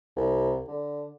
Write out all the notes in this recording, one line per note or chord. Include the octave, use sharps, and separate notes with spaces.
C2
D3